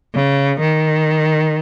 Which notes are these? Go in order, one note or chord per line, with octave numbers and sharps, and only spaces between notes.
C#3
D#3